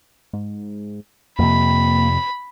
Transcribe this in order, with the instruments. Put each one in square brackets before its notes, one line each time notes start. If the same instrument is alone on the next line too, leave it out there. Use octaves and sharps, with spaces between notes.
[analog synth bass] G#2
[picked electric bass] F2 C3 [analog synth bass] A#3 [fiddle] B5